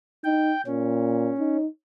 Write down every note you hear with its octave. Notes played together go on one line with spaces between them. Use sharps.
D#4 G5
A#2 C#4
D#4